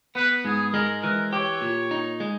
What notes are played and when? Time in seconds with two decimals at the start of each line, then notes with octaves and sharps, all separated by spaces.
0.15 B3 B4
0.45 G#2 G#4
0.74 G#3 A#4
1.03 E3 A#4
1.33 G4 C#5
1.61 A#2
1.91 D#4
2.20 G#3